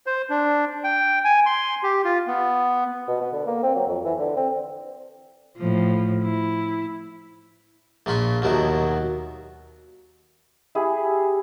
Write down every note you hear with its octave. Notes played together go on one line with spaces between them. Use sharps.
C5
D4
G5
G#5
C6
G4
F4
B3
B2
B3
D3
A#3
C4
F#3
F2
E3
D3
C4
A2 F3
E4
A#1 A#2 F4 B5 C#6
D#2 B2 F#3 E4
E4 G4 G#4